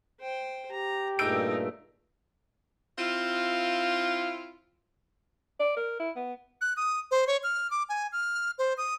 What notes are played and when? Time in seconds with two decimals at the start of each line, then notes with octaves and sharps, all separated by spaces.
0.20 C5 G5
0.72 G4 A#5
1.19 G2 A#2 A3 D#4 G#4 E6 G6 D7
2.99 C4 E4 F4
5.60 D5
5.77 A#4
6.00 E4
6.16 B3
6.61 F#6
6.77 D#6
7.11 C5
7.27 C#5
7.43 F6
7.70 D6
7.89 G#5
8.12 F6
8.58 C5
8.77 D#6